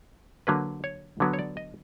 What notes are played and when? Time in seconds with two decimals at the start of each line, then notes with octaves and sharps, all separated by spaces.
0.47 D3 F#3 A#3 B4
0.84 C#5
1.20 D3 F#3 B3
1.33 C#5
1.39 D5
1.57 D#5